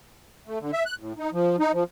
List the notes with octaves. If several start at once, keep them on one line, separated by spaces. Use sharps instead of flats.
A3
D3
E5
F#6
A2
D#4
F3
D#4
F3